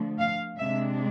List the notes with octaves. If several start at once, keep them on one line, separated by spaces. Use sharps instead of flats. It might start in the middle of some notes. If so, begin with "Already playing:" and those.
Already playing: D3 F3 A3
F5
C3 G#3 D4 E5